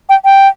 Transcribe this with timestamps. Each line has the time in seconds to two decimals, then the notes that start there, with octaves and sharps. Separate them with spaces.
0.09 G5
0.25 G5